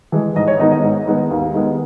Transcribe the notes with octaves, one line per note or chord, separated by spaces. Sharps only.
E3 G#3
G#2 D#5
C#5
D#3 G#3 B3 D#4 D#5
D#5
G#2
D#3 G#3 B3 D#4
D#2
D#3 G#3 B3